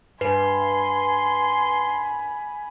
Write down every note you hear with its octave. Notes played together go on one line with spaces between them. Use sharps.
G2 B4 G#5 B5 C6